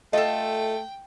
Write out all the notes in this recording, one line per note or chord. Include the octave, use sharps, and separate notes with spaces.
A3 F4 A4 D#5 G5